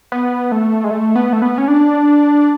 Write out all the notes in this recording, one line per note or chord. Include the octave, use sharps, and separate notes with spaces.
B3
A3
G#3
A3
B3
A3
B3
C#4
D4